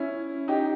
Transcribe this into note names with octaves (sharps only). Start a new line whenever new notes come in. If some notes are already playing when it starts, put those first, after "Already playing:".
Already playing: C#4 E4
D#4 G4